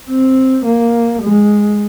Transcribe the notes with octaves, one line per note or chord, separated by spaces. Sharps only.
C4
A#3
G#3